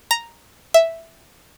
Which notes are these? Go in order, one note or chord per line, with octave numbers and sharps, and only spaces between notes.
A#5
E5